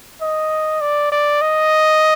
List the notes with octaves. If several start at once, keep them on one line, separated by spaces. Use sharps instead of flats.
D#5
D5
D5
D#5